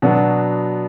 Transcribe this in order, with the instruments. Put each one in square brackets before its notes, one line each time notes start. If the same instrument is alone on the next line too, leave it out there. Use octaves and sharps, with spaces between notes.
[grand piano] B2 F#3 B3 D4